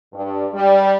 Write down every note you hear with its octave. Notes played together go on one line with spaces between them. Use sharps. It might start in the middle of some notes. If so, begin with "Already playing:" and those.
G2
G3